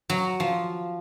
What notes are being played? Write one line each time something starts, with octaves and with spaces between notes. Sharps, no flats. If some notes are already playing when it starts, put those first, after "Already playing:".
F#3
F3